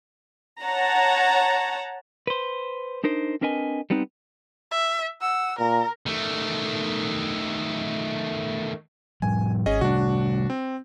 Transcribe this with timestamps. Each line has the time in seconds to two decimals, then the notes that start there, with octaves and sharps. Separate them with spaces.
0.63 C#5 F#5 A5 A#5
2.27 B4 C5
3.04 D4 D#4 A#4 C5
3.41 C4 D4 A#4 B4 D#5 G#5
3.90 G3 B3 C4 D#4 B4
4.71 E5
5.21 F#5 E6
5.59 A#2 A#4 A#5
6.06 D#3 A3
9.22 A2 F3 G3 G#5
9.66 G#1 C#4 G#4 D#5
9.81 C3 G3 A3 D4 F#4
10.50 C4